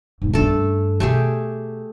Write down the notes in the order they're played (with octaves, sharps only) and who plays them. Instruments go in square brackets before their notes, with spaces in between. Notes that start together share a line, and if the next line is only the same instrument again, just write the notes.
[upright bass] G#2 G#3
[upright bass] G2 C#4 [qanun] A3 A4
[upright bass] B2 [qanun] A3 G4 G#4